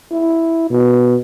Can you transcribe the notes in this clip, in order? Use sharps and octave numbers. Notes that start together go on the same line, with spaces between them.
E4
B2